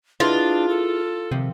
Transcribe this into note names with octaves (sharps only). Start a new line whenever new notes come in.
D4 E4 F4 G#4 B4 D#5
A4
C3 D#3 F3 C4